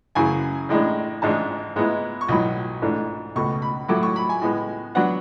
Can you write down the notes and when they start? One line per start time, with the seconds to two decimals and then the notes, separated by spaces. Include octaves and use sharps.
0.15 F#2 C#3 E3 G#5
0.69 A1 A2 G#3 D4
1.22 A1 G#2 G#3 D4 A5
1.76 G#2 G#3 B3 E4
2.21 C#6
2.28 B1 A2 F#3 B5
2.82 G#2 E3 A3 D4
3.36 C#2 B2 A3 C#6
3.62 B5
3.88 A2 F#3 A3 E4 D6
4.03 C#6
4.16 B5
4.29 G#5
4.41 A2 G#3 B3
4.95 F#3 B3 D4 F#5